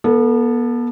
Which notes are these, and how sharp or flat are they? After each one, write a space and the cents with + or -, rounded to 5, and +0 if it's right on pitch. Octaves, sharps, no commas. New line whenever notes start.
B3 -40 A4 +0